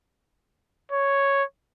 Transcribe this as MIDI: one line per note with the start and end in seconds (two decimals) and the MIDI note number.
0.92 1.44 73